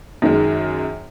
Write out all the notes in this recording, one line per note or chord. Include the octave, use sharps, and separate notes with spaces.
F#2 D#3 G#3